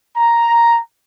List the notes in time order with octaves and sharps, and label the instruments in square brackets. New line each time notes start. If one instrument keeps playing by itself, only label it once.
[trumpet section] A#5